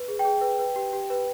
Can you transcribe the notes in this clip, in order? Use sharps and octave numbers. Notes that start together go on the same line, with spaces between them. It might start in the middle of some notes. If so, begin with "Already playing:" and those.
Already playing: B4
G#4
G5
G#4
B4
B4
G4
G4
B4